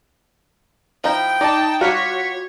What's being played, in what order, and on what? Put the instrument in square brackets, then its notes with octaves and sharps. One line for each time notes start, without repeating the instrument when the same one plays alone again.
[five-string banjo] F3 D#4 E4 [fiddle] G5
[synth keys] D#4 A5 [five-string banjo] D5 D#5
[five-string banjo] G3 F4 F5 [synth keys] F#4 B6 C#7 [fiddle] C#5